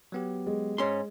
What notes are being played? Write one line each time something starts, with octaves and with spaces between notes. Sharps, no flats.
F#3 B3 G4
G#3
G#2 C#4 C6